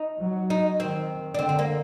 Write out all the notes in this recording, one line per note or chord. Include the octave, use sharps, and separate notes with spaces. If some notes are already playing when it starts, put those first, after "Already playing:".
Already playing: D#4
F#3
D#4
D#3 C4
D4
D3 C4
C4
A#3